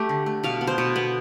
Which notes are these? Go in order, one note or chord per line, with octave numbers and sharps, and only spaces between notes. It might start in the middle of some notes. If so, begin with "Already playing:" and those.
Already playing: A3 G4
D3
A3
B2 F5
B3
C5
B2
B3